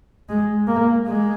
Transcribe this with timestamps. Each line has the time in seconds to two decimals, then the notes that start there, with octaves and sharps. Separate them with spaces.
0.29 G#3
0.68 A#3
1.07 G#3